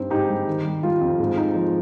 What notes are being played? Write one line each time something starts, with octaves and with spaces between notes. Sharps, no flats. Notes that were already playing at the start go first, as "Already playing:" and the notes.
Already playing: G2 C4 D#4
G#2 D#4 G4
G3
D#3
G3
G3 F4
F2
G#2
D#4
F3